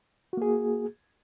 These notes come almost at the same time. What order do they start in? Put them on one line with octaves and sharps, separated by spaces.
F#4 A#3 G#4